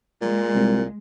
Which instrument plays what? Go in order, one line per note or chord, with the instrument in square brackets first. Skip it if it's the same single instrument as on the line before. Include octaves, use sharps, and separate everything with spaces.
[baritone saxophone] A#2 [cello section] G#3
[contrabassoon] C2